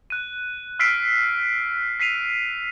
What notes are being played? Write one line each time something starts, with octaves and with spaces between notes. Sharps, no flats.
F#6 D#7
E6 F6 B6 C7 D7
B6 C7 D#7 F7